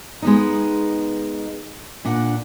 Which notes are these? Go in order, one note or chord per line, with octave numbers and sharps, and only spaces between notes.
G#3 B3 D#4
A#2 D4 F#5